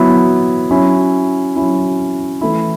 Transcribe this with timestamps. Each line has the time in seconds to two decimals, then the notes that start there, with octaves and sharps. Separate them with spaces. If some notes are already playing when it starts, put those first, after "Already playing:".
Already playing: F#3 B3 E4
0.70 F#3 C#4 E4
1.56 F#3 C#4 E4
2.41 E3 A3 E4